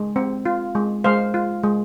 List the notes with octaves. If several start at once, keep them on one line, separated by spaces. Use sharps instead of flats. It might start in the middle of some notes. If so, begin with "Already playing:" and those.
Already playing: G#3
C4
F4
G#3
G#3 C5 F5
F4
G#3